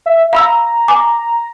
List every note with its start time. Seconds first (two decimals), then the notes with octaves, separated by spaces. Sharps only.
0.06 E5
0.33 F5 A#5 B5 E6
0.88 G#5 D6